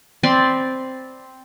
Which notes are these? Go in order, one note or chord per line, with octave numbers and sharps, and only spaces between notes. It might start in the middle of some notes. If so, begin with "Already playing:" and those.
C4 D5 B5 C6